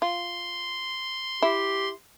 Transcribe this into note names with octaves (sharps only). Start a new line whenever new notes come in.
F4 C6
E4 G4